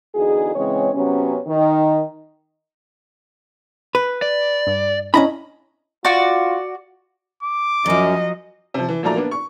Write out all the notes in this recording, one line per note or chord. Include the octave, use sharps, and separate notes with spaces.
E2 D3 D#4 F#4 G#4
C#3 E3 G#3 C4 C#5
C3 F#3 B3 C#4
D#3
B4
D5
G2
C#4 D4 E4 D#5 A#5 B5
F4 F#4 D5
D6
F#2 F3 F#3 D#5
C3 F3
E3
A#2 F3 F#3 A3 D5 A#5
A#3 B3 D4
C#6